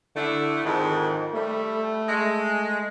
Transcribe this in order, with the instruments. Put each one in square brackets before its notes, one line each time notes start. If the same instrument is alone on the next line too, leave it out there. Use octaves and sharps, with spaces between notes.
[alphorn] D3 [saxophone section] A3 D4 E4
[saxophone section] F2 G#2 [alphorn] D#3
[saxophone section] G3 [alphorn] A3
[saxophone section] G#3